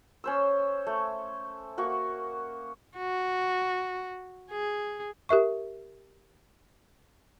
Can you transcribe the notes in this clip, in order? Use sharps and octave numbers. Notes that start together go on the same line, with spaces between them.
C#4 C5 E6
A3
A#3 F#4 F#5 C#6
F#4
G#4
G4 A#4 E5 C#6